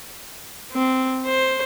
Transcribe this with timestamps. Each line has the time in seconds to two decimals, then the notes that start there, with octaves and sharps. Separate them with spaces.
0.73 C4
1.26 C5